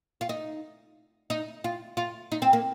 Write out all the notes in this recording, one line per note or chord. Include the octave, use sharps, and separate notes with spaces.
F4
D#4
D#4
F4
F4
D#4
C4
A#3